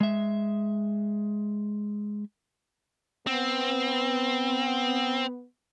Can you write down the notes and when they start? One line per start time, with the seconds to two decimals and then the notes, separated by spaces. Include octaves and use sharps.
0.01 G#3 E5
3.27 B3 C4